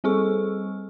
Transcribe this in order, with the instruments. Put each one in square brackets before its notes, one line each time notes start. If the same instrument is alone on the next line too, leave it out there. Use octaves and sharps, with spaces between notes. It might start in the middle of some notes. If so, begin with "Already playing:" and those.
[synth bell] G3 C4 G#4 A4 C#6